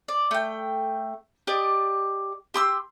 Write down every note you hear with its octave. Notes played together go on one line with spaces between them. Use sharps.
D5
A3 G5
G4 D5 D#5
G4 C6 D#6 E6